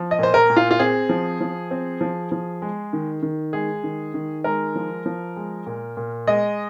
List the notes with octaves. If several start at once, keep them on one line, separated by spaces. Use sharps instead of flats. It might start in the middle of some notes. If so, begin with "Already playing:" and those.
Already playing: F3
D#5
A#2 C5
A#4
A#2
F4
F4
C4 G#4
F3
F3
C4
F3
F3
G#3
D#3
D#3
G#3 G#4
D#3
D#3
G#3 A#4
F3
F3
G#3
A#2
A#2
G#3 D#5